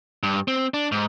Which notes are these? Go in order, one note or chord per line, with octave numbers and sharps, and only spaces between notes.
G2
C4
D4
G#2